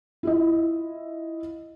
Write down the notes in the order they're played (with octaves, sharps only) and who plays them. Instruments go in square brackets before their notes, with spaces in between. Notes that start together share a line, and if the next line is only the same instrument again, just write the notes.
[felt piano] E4 F4 D#5